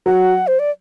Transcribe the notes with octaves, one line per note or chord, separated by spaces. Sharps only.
F#3 F#5
C5
D5